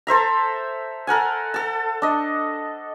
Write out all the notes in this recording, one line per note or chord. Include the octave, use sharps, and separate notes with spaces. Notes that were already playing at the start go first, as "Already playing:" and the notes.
A4 C5 E5 A#5
A4 A#4 F#5 G#5
A4 A5
D4 D#5